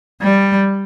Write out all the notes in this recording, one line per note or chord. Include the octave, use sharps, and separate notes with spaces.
G3